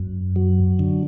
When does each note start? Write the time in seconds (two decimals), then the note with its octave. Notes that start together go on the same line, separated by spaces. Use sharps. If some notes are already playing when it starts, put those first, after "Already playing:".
Already playing: F#2
0.36 F#3
0.79 D3